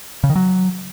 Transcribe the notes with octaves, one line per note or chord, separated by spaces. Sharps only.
C#3
D#3
F#3